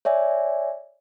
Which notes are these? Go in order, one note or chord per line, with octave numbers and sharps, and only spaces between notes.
C#5 D5 E5 G#5